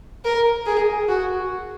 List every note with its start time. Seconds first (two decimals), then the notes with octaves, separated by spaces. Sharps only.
0.25 A#4
0.66 G#4
1.08 F#4